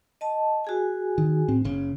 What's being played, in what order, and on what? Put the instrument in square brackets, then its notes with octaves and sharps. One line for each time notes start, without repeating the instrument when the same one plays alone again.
[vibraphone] D#5 A5
F#4 G#4 G#5
[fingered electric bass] D#3
A2 C4
F#1 C#3